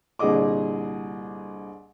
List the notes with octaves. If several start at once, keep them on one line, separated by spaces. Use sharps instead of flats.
C2 A#2 D3 G#4 D#5 D6